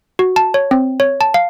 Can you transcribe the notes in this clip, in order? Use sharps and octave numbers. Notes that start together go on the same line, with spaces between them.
F#4
A5
C#5
C4
C#5
A5
F5